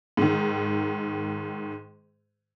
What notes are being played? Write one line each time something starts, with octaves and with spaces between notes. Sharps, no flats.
G#2 D#3